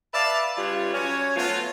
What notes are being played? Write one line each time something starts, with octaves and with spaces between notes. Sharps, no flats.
B4 D5 E5 F5 A5
C#3 G3 F4 B4 C#5
F#3 C#4 C#5
F#3 A3 B3 F4